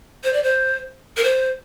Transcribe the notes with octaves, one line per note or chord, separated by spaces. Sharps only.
C5
D5
C5
A#4
C5